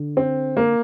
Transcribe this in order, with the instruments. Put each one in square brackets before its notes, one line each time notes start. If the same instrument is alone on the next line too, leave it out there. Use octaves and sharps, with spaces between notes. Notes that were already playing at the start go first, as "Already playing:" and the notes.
Already playing: [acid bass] D3
[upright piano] C4
A#3